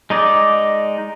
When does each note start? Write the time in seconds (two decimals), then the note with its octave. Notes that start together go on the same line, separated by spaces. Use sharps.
0.10 G#3 D#4 D5